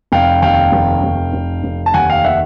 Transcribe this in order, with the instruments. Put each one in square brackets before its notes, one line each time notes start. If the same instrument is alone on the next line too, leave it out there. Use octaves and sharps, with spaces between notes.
[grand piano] F1 F5 G5
D#2 F5 G5
F1
F1
F1
F1
A5
D#2 F#5 G#5
F5 G5
D#3 E5 F#5